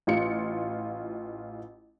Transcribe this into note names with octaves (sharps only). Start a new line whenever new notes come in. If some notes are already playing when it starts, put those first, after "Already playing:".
A1 F4 C#7